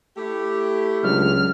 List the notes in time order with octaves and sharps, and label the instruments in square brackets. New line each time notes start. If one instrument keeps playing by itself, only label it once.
[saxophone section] A3 E4 G4
[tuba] C#2 [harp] F#3 C#4 D4 [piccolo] F6